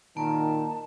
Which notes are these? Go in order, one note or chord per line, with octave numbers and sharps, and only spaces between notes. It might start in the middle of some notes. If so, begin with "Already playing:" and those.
A#2 D#3 A#3 A5